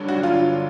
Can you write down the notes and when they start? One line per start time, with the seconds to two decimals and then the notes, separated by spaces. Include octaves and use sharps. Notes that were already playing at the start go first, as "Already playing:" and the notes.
Already playing: G2 D3 F#3
0.08 F#4
0.23 F4